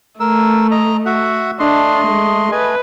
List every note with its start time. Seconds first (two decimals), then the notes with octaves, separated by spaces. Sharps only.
0.20 A3 A#4 E6
0.71 D#5 A#5
1.06 F#4 E5 F#5
1.59 A3 D4 D#5 C6
2.07 G#3
2.52 A3 B4 D#5 G#5